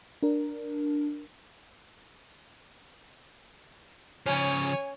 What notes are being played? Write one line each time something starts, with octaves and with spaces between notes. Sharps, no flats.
D4 A#4
C#3 F3 C#4 C#5 G#5